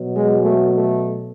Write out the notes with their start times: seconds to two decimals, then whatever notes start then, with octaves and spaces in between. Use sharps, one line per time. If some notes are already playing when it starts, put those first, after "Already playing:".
Already playing: B2 F#3
0.15 G#3
0.43 A3
0.74 A3